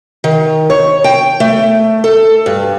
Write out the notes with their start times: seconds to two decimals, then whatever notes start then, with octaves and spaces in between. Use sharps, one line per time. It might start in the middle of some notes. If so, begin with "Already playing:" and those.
0.24 D#3
0.70 C#5
1.04 G5
1.40 A3
2.04 A4
2.46 G2